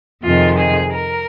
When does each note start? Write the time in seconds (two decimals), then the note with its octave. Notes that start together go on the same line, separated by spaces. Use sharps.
0.23 F2 C3 D#3 G#3 F4
0.58 G#4
0.93 A#4